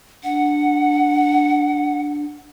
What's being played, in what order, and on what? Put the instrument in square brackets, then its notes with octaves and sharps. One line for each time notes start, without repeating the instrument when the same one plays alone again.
[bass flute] D4 [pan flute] F#5